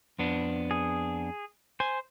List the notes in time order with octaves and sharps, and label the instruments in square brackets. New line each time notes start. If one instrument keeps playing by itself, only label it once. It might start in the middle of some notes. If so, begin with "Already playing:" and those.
[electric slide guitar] F2 B3 D4
[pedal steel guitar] G#4
[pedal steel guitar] C5 [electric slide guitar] G#5